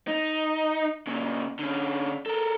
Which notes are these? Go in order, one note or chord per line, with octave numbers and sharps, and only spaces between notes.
D#4
A#2 C#3
D3 C#4
A4 A#4